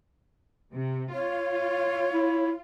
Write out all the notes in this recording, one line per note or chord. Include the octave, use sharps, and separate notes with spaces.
C3
F4 C#5
E4